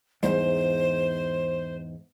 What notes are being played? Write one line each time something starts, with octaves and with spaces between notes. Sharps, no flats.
E2 G#2 G3 C5